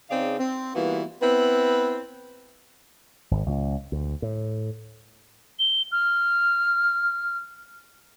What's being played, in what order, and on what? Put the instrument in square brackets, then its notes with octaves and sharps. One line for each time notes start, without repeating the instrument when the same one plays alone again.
[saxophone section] C#3 C4 D#4 G#4 D5 F5
C4
E3 G3 A#3 B3 F4 F#4
B3 C4 E4 B4
[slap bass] G#1
C#2
D2
A2
[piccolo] G7
F6